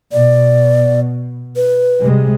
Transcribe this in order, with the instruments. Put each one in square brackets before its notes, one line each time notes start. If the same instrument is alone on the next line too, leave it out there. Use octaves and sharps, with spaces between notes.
[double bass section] B2 [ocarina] D5
[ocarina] B4
[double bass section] C3 G3 G#3